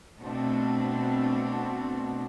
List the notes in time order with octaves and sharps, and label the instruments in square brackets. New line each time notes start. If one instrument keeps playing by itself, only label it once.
[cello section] B2 A3 C4 D4